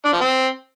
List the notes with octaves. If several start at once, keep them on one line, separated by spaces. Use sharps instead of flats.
D4
F3
C4